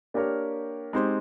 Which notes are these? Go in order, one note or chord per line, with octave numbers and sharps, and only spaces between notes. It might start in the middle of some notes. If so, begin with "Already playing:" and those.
A#3 D4 G4 A#4 C#5
G#3 C4 D#4 G4 C5